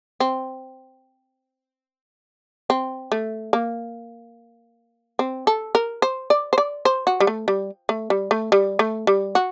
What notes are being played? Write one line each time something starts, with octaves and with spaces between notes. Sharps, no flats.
C4
C4
A3
A#3
C4
A4
A#4
C5
D5
C5
D5
C5
F#4
G3
A3
G3
A3
G3
A3
G3
A3
G3
F#4